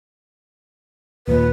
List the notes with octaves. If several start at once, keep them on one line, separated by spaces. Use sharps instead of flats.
D#2 A#2 B4